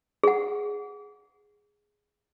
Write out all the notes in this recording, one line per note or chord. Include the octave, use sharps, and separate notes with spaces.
G#4 F#5